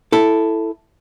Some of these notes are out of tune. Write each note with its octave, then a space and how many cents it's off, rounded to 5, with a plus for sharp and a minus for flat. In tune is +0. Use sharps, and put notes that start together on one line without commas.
E4 +0 A4 +0